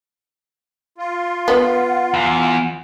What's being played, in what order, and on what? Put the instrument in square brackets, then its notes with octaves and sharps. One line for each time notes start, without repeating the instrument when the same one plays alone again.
[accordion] F4
[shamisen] B3 [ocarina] F#5
[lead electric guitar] E2